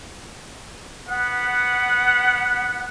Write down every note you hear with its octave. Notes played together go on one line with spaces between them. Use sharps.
B3 F#5